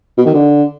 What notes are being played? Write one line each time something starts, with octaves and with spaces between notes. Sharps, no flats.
B2
D#3
D3